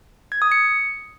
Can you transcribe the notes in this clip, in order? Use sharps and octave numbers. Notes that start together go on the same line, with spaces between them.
G#6
D#6
C#7